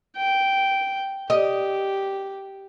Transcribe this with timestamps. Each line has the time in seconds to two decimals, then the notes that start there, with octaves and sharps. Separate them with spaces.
0.16 G5
1.30 G4 D#5